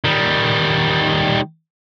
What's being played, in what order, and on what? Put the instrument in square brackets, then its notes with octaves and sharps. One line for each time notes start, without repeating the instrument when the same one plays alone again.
[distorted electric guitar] D#3 G3